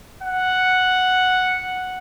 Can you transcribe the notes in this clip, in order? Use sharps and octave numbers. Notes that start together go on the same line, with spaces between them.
F#5